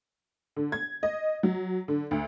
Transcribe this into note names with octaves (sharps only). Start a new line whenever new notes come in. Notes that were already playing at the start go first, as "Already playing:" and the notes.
D3
G#6
D#5
F#3
D3
D2